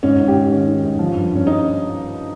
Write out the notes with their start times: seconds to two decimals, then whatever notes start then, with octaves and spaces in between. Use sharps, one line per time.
0.03 G#2 C#4
0.20 G#2
0.28 G4
0.36 G#2
0.52 D#3 C#4
0.68 D#3
0.83 G#2
0.99 F3
1.15 G2
1.31 G2 C#4
1.47 D#4